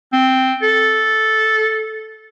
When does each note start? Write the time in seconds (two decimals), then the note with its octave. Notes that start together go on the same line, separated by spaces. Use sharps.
0.13 C4
0.63 A4